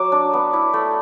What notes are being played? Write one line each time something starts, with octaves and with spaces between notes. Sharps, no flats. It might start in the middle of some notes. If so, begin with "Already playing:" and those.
Already playing: F#3 D6
D4
B3
E4
A3